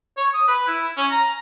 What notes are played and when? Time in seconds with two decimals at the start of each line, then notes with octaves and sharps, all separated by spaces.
0.17 C#5
0.34 D#6
0.48 B4
0.68 E4
0.97 C#4
1.11 A#5